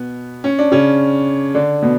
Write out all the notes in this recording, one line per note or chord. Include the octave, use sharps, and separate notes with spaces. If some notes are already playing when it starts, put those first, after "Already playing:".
Already playing: B2 B3
C#4
D4
C#3 C#4
D3 D4
B2 B3